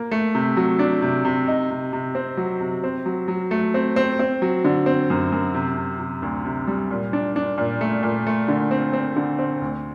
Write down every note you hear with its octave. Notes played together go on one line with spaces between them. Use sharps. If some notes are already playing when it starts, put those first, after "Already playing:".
Already playing: A#3
A3
C3
F#3
D4
C3
C3
D#4
C3
C3
C4
F#3
C3
C4
F#3
F#3
A3
C4
C4
C4
F#3
D3
C4
F#2
F#2
C3
C3
C3
D2
C3
G3
A#2
D4
D4
A#2
A3
A#2
A3
D3
C4
C4
D3
C4
D2